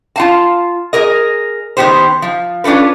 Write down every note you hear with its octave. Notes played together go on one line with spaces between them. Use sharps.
F4 F5 A5
G#4 A#4 D#5
D#3 E3 B3 G4 C5
F3
C#4 D4 F4 A4 B4